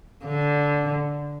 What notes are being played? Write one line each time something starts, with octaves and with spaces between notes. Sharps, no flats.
D3